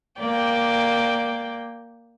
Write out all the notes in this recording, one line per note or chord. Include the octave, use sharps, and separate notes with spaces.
A#3 D5 G5